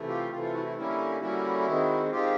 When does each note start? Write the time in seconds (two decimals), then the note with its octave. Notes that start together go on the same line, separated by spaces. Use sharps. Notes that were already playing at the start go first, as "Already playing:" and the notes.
Already playing: C3 E3 A3
0.08 F4 G4
0.31 C3 E3 A3 F4
0.42 F4
0.54 E4 F#4
0.65 E4
0.77 D3 G3 A#3 C#4 E4
1.21 D3 G3 A#3 C#4 E4 F#4
1.67 D#3 G#3 C4
2.11 D#3 G#3 C4 F4 G4